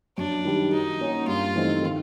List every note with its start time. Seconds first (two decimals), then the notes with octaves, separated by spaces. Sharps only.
0.17 F#2 D4
0.45 D#3 G3
0.72 F#3 D#4
1.00 A#3 C#4 F#4
1.27 G2 F4
1.55 E3 A3 C4 D#4
1.83 D#3